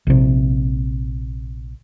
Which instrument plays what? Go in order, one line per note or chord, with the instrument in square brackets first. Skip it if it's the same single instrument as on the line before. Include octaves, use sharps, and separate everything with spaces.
[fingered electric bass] A#1 C3